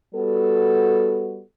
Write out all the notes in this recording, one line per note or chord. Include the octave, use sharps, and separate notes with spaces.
G3 B3 F#4 A4